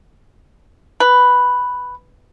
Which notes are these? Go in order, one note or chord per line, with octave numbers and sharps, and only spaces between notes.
B4